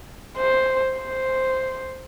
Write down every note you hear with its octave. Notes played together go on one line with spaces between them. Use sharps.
C5
C5